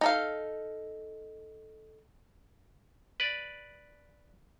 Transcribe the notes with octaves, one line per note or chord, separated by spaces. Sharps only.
D#4 A4 F5
B4 D5